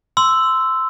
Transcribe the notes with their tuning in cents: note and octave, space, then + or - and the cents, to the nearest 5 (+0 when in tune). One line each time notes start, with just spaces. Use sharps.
C6 -15 E6 +0